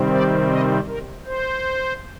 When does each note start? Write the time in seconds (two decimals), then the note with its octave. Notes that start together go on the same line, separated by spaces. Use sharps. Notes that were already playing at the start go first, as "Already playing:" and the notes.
Already playing: C3 D#3 G3 C4
0.12 D5
0.50 D#5
0.87 A#4
1.26 C5